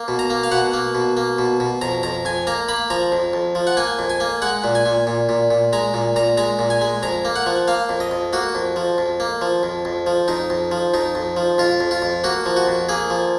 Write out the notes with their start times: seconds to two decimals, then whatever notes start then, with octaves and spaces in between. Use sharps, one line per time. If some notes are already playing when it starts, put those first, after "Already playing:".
Already playing: A#3
0.08 B2
0.19 A#5
0.30 A#3
0.43 F5
0.52 B2 F#5
0.73 A#3
0.95 B2
1.17 A#3
1.39 B2
1.60 B2
1.81 F2 A#5
2.03 F2 A#5
2.25 F2 G#5
2.47 A#3 A#5
2.68 A#3 B5
2.90 F3 A#5
3.12 F2
3.33 F2
3.55 F3
3.67 F#5
3.77 A#3 G#5
3.99 F2
4.10 G#5
4.20 A#3
4.42 G#3 F#5
4.64 A#2
4.75 G#5
4.86 A#2
5.07 A#2
5.29 A#2
5.51 A#2
5.73 G#3 A#5
5.94 A#2
6.16 A#2 A#5
6.37 G#3 A#5
6.59 A#2
6.70 G#5
6.81 G#3
7.03 F2 A#5
7.25 A#3
7.36 F#5
7.46 F3
7.68 A#3 F5
7.89 F2
8.00 D#5
8.11 F2
8.33 A#3 F#4
8.55 F2
8.76 F3
8.98 F2
9.20 A#3
9.41 F3
9.63 F2
9.85 F2
10.07 F3
10.28 F2 D#4
10.50 F2
10.71 F3
10.94 F2 D#4
11.15 F2
11.37 F3
11.58 F2 F4
11.80 F2
11.91 F4
12.02 F2
12.24 A#3 F#4
12.46 F3
12.56 F#4
12.67 F2
12.89 A#3 G#4
13.10 F3